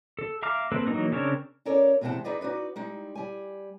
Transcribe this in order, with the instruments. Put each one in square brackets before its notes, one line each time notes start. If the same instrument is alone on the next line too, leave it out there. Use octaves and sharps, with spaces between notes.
[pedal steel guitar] A4
E5 F5 A#5 D6 F6
A#3 C4 A4 B4
E3 F#3 A#3 D#4 A#4
C#3 C4 D4 A#4 C#5
[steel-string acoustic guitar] C#4 A4 A#4 C#5 D5
E2 C3 G#3 C4 F#5 A5
D#4 G#4 B4 D5 D#5
D#4 F#4 B4 D5
G3 G#3 D#4
G3 G#5